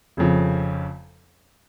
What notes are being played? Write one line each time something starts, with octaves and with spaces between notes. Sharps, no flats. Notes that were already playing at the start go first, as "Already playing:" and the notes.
F1 F2 C#3 F3